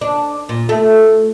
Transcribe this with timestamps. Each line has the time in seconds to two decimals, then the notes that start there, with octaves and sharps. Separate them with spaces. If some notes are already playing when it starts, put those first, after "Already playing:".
0.01 D4
0.49 A#2
0.69 A3